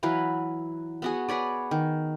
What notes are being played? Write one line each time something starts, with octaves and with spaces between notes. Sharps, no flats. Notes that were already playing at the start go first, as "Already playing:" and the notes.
E3 F#3 B4 F5
B3 F#4 G#4
G#4 B4 C#5 D5
D#3